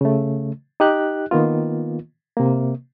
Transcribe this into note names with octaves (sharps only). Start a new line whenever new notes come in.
C#3 A3
D#4 G4 F#6
D#3 A#3 B3 F4
C3 A#3